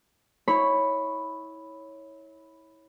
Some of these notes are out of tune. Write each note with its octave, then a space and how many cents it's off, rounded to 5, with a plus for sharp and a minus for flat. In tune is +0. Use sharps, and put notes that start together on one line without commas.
E4 -30 C#5 -5 B5 +0